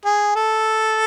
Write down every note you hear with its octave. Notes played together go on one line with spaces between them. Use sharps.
G#4
A4